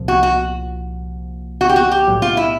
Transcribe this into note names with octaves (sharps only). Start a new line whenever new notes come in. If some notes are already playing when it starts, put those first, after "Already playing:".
Already playing: C2 A#2 F3
F#4
F#4
F#4
G4
F#4
G4
B1 A2 F#3
F4
E4